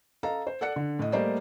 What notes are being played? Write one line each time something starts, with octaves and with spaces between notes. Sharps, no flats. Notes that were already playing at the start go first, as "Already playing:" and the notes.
A4 D#5 F5 A#5
C5
A4 D5 F#5 F#6 C#7
D3
A2 D#5
G3 A3 A#3 C5 D5 D#5